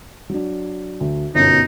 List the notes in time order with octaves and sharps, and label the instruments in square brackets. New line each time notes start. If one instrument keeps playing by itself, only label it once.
[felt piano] F#3 D4
D2
[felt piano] G1 F#2 B2 [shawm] D#4